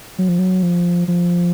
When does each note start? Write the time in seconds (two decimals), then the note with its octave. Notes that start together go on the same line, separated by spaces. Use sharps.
0.19 F#3
0.29 F3
0.39 F#3
0.63 F3
1.08 F3